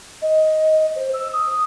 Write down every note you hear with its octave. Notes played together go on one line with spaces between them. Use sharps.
D#5
C5
E6
D#6